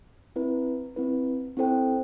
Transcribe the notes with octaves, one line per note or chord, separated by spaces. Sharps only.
C4 E4 B4
C4 E4 B4
C4 E4 A4 C5 G5